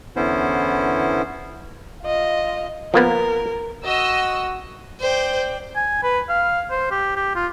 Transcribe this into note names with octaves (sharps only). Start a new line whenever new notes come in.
E2 D3 B3 C#4 E4 C5
F4 D#5
F3 A#3 B3 A#4
F#4 D#5 E6
C5 D5 G5
G#5
B4
F5
C5
G4
G4
F4